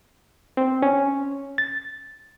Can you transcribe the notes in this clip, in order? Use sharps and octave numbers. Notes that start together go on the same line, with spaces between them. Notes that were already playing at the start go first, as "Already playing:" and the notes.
C4
C#4
A6